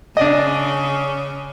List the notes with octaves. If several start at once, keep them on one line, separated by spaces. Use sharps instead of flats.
C#3 C#4 D4 D5 D#5